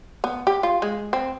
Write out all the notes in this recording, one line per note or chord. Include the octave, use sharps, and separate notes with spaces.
B3
G4
F4
G#3
C4